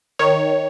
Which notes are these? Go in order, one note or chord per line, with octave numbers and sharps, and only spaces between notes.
D#3 C#5